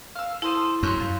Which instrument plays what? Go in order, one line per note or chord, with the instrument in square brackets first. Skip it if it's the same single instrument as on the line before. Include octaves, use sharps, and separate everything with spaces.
[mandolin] F5 E6
[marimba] E4 [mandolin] A4 C5 D#6
[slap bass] F#2 [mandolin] C#5 C6
[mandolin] F4